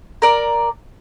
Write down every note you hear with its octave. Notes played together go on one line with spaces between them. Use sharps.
A#4 D5